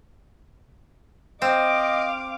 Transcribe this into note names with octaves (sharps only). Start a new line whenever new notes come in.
C4 D#5 F5 D6